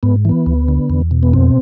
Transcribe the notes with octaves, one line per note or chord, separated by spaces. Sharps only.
G#2 B3
E3 B3
D2
D3
E2
B2
B3
F2 C4